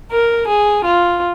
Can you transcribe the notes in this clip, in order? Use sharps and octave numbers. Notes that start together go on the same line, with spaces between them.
A#4
G#4
F4